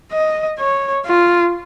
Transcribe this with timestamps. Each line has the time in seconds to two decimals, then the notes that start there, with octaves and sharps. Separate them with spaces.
0.12 D#5
0.59 C#5
1.06 F4